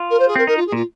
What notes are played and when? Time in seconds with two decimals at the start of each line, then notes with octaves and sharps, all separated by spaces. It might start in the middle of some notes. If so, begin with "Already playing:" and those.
Already playing: F4
0.10 A#4
0.19 C5
0.27 G#4
0.36 C4 A#4
0.47 D#4 A#4
0.56 F4
0.66 G#4
0.72 A#2 F4